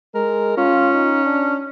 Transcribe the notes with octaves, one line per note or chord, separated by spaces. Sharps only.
G#3 A#4
C#4 F4
D#4
D4